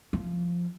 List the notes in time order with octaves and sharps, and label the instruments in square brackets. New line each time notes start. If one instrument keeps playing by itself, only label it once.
[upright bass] F3